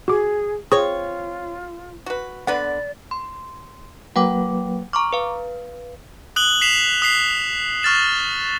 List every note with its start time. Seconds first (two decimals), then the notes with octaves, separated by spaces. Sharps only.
0.08 F#4 G#4 D6
0.72 C4 F4 G#4 C#5 C#6 D#6
2.06 F#4 B4
2.47 D3 B3 B4 D5 F#5
3.11 C6
4.16 F#3 A#3 B4 F#5 G5 D6
4.93 A#5 C#6 D6 F6
5.13 B4 F5
6.36 D#6 F#6 F#7 G7
6.61 B6 C7 E7 F7
7.02 D#6 B6 C7
7.83 C#6 F6 A6 E7